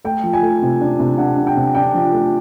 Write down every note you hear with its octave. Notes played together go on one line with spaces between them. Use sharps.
A3 G5
F3
G#5
A3
C3
D4
C3
D4 F#5
D4
G5
C3
D4 G5
F3
A3